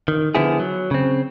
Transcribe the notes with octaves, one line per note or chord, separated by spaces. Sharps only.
D#3
D3 F3 B3 E4 G#4
F#3
C#3 C4